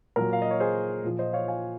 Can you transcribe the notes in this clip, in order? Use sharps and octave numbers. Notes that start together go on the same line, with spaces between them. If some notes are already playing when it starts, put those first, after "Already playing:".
A#2 F#3 A#4
F5
D#5
C#5
G#4 C5
A#2 F3
C5 D#5
C#5 F5
F5 G#5